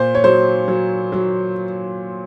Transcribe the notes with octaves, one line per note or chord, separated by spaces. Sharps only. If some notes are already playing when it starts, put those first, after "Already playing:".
Already playing: A#2 C5
C#5
F#3 C5
F#3
F#3